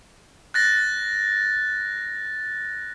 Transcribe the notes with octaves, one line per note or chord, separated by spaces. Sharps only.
F#6 A6 A#6